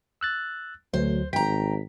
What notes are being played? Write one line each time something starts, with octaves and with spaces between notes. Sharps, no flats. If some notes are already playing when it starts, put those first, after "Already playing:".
E6 F#6 A6
D2 F#3 A3 C5
G#1 G5 A#5 B6